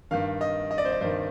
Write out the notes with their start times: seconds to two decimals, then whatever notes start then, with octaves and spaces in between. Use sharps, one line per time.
0.11 G2 D#3 F5
0.41 D#5
0.71 D#5
0.78 D5
0.85 C5
0.92 D5
1.01 G2 D#3 C5